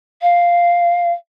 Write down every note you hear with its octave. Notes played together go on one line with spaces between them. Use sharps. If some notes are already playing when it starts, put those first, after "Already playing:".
F5